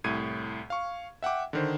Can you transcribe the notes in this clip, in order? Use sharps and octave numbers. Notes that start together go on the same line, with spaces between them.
C2 A2 G#6 D#7
F5 C#6
E5 F#5 G5 D6
D3 D#3 C5